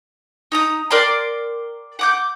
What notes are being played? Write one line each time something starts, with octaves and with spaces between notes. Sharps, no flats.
D#4 A#5 D#6
A#4 D5 G5 C6
F#5 D6 G6